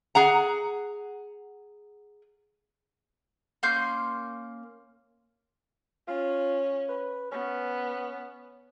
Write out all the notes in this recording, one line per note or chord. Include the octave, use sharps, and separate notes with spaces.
G#4 F#5 A#5
A#3 C#4 C6 G6
C#4 F4
B4
B3 C#4